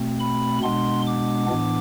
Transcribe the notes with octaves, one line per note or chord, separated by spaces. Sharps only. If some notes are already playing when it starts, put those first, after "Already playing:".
Already playing: B2 A3 C4
B5
B2 G#3 B3 D4 C6
D6
A2 E3 B3 D4